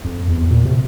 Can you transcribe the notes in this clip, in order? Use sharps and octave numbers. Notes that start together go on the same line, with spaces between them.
F2
E2
A#2
C3